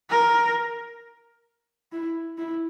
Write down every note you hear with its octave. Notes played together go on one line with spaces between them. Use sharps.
A#4
E4
E4